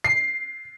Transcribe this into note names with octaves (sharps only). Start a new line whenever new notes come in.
C7